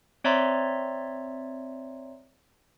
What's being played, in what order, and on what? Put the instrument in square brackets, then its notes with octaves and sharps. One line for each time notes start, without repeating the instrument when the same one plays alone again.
[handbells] C4 C#5 D5 E5 A#5 C6